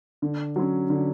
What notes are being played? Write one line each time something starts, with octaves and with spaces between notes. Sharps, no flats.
D3
F#3 C#4
D3